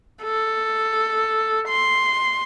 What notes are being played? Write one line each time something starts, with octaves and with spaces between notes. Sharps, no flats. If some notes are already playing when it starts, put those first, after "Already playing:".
A4
C6